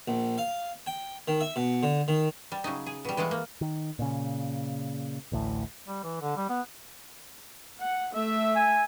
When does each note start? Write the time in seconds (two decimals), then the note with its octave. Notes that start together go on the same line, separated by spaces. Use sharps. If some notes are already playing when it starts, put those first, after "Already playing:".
0.08 A#1
0.38 F5
0.87 G5
1.28 D#3
1.41 E5
1.56 B2
1.83 D3
2.08 D#3
2.52 G3
2.64 C#3 F#3 D#4
2.86 G#4
3.05 B2 G3
3.17 E3 G#3 A3 F5 F#5
3.31 A#3
3.61 D#3
3.99 A#2 C#3
5.32 A1 D2 A2
5.87 G3
6.03 E3
6.21 D3
6.37 G3
6.49 B3
7.80 F#5
8.13 A3 E5
8.56 G#5